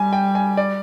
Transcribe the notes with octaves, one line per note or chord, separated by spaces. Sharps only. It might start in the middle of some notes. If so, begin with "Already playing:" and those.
Already playing: G3 G#5
G5
G#5
D5